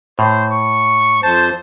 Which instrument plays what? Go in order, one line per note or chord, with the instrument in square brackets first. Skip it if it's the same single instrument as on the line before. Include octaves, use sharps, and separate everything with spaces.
[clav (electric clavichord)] A2 [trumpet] C5
[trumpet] C#6
[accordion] F2 C5 [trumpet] A5